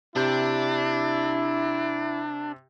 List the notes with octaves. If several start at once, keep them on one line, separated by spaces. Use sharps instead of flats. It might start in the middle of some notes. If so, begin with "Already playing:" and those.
C3 D4 E4 G4 G6